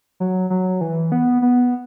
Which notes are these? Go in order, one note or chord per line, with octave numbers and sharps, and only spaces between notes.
F#3
F#3
E3
B3
B3